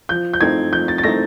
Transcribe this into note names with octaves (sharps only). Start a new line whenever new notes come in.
F3 G6
G6
A3 C4 D#4 G#6
F3 G6
A6
A6
A3 C4 D#4 A#6